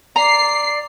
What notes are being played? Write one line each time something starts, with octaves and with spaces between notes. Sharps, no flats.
D5 A#5 C7